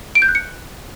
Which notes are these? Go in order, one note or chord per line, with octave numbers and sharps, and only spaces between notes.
D7
G6
F#6
C#7